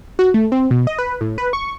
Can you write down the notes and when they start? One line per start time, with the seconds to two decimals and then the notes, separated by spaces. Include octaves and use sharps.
0.19 F#4
0.34 A3
0.52 C4
0.71 B2
0.87 D#5
0.98 B4
1.21 A2
1.38 B4
1.53 C#6